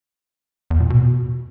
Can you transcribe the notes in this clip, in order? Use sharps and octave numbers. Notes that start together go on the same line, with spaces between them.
E2
A#2
B2